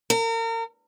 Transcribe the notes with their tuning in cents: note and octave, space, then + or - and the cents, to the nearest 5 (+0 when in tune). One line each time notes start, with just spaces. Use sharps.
A#4 -35